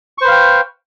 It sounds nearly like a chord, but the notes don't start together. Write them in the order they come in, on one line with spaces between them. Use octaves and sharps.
C#6 C5 B4 F5 G5